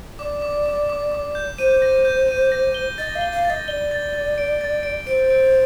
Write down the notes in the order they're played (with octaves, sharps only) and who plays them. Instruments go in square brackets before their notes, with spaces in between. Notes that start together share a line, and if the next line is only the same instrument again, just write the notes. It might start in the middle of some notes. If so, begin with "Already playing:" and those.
[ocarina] D5 [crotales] D6
[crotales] D6
D6
D6
D6
G6
[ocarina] C5 [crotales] D#7
[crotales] A#6
G6
D#7
A#6
G7
[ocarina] D#5 [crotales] A6
[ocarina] F5
[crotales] G7
[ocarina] F5
[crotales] A6
[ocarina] D#5
[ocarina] D5 [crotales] G7
[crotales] A6
A6
D7
A6
D7
[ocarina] C5 [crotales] D7
[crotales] D7